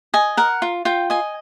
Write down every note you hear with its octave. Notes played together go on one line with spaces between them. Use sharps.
D#5 G#5
A#4 F#5
F4
F4 G5
D#5 G#5